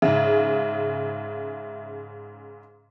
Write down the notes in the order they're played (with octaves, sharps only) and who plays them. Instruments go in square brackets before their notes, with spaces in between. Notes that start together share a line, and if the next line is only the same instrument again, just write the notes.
[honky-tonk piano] G#2 C#3 [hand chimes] E5